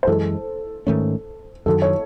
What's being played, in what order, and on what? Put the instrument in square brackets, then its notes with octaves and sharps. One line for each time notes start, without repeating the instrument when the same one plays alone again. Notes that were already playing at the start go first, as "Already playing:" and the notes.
[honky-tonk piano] C5
[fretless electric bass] F#2 E3 G#3 [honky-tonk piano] A4
[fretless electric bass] G#2 D#3 A3 C#4
[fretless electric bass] F#2 D#3 F#3 [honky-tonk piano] A4
[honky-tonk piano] C#5